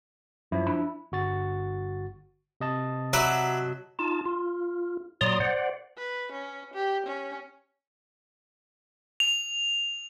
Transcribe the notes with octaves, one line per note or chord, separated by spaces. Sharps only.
F#2 F3 E4
D4 E5 B5
G1 F#4 A6
C3 D#5 A5
F#3 D5 E5 B5
D#4 F4 A5
F4
A#2 F#3 D5 A#5 C6 D#6
C5 D5 F#5
B4
C#4
G4
C#4
F7